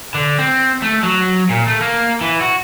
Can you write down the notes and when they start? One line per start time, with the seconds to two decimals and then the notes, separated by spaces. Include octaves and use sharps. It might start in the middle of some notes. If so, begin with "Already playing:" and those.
0.14 D3
0.38 C4
0.82 A3
1.03 F#3
1.49 A#2
1.67 A3
1.81 A#3
2.21 E3
2.41 F#4